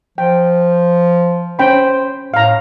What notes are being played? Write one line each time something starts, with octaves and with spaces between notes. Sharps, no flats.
F3 G5
C#4 C5 G5 B5
A2 F5 A#5